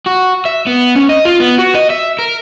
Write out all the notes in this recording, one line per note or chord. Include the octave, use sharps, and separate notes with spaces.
F#4
E5
B3
C#4
D#5
F4
B3
F#4
D#5
E5
A#4